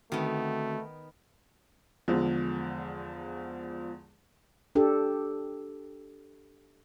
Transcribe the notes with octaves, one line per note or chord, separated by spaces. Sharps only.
D3 D#3 A3 B3 C4 F#4
E2 D3 F3 G#3
D4 G4 A4